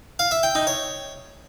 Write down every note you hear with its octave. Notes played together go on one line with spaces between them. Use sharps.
F5
E5
G5
D#4
C#5